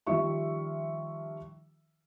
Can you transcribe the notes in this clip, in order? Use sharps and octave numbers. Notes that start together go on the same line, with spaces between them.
D#3 F3 G3 F4 E5 C#6